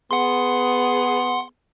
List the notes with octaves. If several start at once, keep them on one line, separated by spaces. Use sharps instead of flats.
B3 G#4 F#5 C6